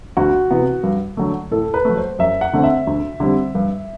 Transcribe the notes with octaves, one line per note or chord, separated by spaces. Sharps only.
D2 F#4
C3 E3 B3
G2
D3 F#3 A3
A2 A4
B4
F#3 A3
C5
F#2 E5
F#5
D3 A3 C4
E5
D2
D3 G3 C4
G2